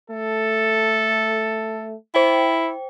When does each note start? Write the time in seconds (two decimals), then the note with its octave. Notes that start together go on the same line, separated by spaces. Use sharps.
0.10 A3 A4
2.15 E4 C5 G5